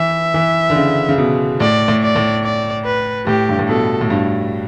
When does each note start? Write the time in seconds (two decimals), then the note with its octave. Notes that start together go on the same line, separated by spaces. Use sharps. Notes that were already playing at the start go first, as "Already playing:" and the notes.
Already playing: E3 E5
0.34 E3
0.70 D3
0.76 C#3
1.09 C#3
1.18 B2
1.60 A2 D5
1.88 A2
2.02 D5
2.16 A2
2.44 D5
2.85 B4
3.26 A2 G4
3.49 G2
3.59 A2
3.68 B2 A4
4.01 A2
4.10 G2